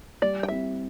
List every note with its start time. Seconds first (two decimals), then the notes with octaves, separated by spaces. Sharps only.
0.22 G3 D5
0.43 G5
0.48 C4 E4 G4 E5